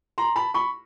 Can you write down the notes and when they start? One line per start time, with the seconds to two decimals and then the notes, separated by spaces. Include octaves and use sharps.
0.18 A#5 C6
0.36 A5 B5
0.54 B5 C#6